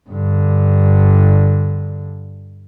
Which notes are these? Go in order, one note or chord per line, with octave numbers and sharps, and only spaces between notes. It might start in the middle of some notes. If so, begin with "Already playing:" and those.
G2 D3